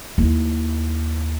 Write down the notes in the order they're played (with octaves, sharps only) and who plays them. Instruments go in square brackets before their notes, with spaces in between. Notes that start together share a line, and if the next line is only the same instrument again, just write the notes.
[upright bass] D#2 E4